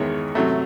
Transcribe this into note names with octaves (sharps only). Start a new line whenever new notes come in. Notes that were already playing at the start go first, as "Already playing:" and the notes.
Already playing: E2 D#3 G#3 C#5
C3 F#3 A3